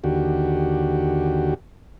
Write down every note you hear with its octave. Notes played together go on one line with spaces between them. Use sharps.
D#2 D3 F#4 G4